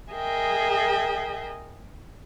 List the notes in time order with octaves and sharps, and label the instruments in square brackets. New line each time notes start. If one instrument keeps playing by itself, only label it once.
[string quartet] G#4 A#4 D#5 E5 G5